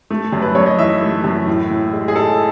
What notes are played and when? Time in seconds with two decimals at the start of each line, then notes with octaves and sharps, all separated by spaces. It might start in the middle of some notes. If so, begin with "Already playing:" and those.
0.10 A3
0.33 F#2
0.42 B4
0.55 F#2 C#5
0.66 D#5
0.78 E3 E5
1.02 A3
1.24 F#2
1.47 A2
1.70 A2
1.93 G#3
2.08 G#4
2.16 G#3 A4